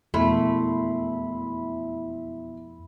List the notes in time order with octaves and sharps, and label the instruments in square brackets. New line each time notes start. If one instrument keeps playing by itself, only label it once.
[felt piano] E1 [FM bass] F2 [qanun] A3 [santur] E4 B5 C6